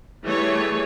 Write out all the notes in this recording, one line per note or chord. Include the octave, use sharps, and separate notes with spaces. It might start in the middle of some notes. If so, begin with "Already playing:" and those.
E3 G3 A3 G#4 C#5